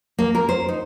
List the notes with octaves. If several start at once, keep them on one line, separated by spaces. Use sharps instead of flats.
A#3
A#4
C5
D#4